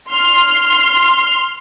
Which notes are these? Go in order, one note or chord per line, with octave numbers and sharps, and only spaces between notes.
C6 F6